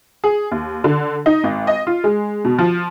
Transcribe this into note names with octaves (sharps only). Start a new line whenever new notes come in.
G#4
D#2
D3
D#4
G#1
D#5
F4
G#3
B2
F3